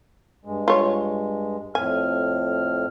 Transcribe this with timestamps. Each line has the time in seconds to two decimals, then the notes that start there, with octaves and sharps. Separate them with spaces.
0.45 G2 G#3
0.68 F4 C#5
1.75 F2 A2 G#5 F6